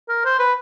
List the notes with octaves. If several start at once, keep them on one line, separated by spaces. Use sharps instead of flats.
A#4
C5
B4